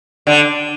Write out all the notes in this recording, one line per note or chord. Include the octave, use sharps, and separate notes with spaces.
D3